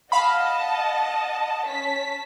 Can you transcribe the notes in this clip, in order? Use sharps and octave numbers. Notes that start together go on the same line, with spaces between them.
D#5 F5 F#5 A5 B5
C#4 A5 B6